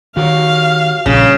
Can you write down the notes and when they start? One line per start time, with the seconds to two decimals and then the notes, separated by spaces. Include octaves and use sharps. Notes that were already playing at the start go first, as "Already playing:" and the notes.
0.17 D#3 F#4 G4 C#5 F5
1.06 A#1 G2 A#2 C#3